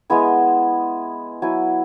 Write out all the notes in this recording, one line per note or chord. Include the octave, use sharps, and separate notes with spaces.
G#3 B3 E4 G#5
F#3 E4 G#5